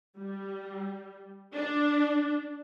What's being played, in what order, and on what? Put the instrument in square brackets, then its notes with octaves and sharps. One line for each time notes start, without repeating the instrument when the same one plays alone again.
[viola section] G3
D4